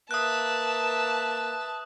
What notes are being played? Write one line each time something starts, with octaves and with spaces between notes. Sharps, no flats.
A#3 B4 E5 A5 D#6 F#6